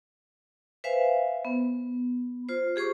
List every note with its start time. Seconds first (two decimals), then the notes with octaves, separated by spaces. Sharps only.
0.84 B4 C5 E5 F5 G#5
1.45 B3
2.49 F4 C5
2.76 G4 G#4 C5 C#6 D6